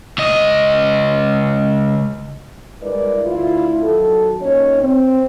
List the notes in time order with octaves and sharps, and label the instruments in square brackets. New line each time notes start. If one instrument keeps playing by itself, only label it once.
[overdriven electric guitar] C#2 D#5
[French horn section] G2 G#3 E4 A#4 B4 D5
D2 E4 F4
D#3 F#3 F#4 A4
A#2 C#4 D#4 C#5
C4